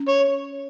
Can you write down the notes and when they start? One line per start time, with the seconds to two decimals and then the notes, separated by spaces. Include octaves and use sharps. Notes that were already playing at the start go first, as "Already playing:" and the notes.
Already playing: C#4
0.08 C#5